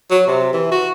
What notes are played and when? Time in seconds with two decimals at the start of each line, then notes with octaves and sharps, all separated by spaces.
0.11 F#3
0.27 C3
0.54 E3
0.72 F#4